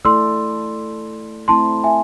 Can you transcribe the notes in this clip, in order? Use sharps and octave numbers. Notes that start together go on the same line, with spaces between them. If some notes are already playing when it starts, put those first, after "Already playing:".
A3 E4 A4 D5 C6 E6
A3 C4 E4 A5 C6
E5 G#5